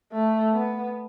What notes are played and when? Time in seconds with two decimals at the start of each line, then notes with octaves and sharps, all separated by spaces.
0.12 A3
0.53 B3